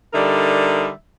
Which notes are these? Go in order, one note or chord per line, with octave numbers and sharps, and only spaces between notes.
D3 G3 D#4 A#4 E5